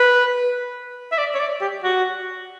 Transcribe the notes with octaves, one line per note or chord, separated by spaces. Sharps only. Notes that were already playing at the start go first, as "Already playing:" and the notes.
Already playing: B4
E5
D5
C#5
D5
G4
F#4